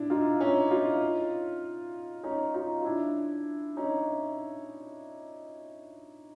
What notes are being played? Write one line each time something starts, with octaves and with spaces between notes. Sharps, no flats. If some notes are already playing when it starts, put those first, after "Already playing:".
Already playing: D4 E4
D#4 F4
C#4 D#4
D#4 F4
C#4 D#4
D#4 F4
F4
D4 E4
C#4 D#4